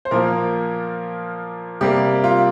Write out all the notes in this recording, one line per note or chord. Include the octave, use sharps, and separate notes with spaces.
C5
A#2 F3 A#3 A#4
C3 G3 A#3 G4
F4